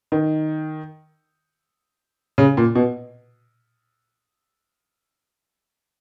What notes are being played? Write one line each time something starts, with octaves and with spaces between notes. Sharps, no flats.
D#3
C#3
A#2
B2